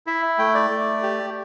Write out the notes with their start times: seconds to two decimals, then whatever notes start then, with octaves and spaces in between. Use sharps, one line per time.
0.07 E4 E5
0.38 A3 G5
0.54 D5
0.70 A3
1.03 G4